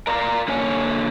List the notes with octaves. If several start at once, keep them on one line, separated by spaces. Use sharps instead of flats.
A#4 D5 F5 A#5
D3 A#3 C#5 G#5